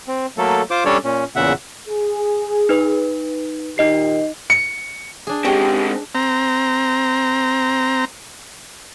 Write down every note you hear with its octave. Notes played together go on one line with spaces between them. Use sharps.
C4
F#3 A3 A#3 A4
F4 C5 D6
G3 C#4 D4 A4 C#5 D5
A#2 C#4
E2 A#2 C#3 E5 F#5
G#4
D#4 B4
A#2 D#3 D#4 G4 D#5 C7
C#7
D4 G#4
G#3 C4 C#4 G4 G5
C4 A#5